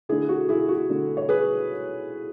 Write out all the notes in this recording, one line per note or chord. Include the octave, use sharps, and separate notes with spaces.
D3 A3 D4 E4 G#4
F#4
E4 G#4
F#4
D3 A3 D4
C#5
G#4 B4